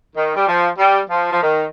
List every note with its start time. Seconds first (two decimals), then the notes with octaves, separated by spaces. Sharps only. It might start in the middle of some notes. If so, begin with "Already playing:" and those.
0.15 D#3
0.36 G3
0.47 F3
0.78 G3
1.10 F3
1.32 F3
1.42 D#3